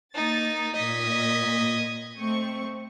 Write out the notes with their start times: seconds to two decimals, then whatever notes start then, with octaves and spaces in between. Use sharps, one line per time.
0.15 A#3 D#4 A6
0.76 A#2 D#5 G#6 B6
2.19 A3 C4 C#6